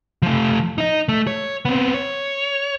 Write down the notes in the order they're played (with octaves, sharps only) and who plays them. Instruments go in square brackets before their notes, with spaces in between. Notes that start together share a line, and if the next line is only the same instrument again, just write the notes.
[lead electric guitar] F3 A3
D#4 D#5
A3
C#5
B3 C4
C#5